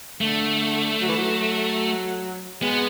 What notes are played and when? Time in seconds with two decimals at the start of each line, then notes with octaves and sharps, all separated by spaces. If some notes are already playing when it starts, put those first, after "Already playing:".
0.20 D3 A3
1.01 F#3
1.09 E3
1.17 F#3
2.61 G#3 B3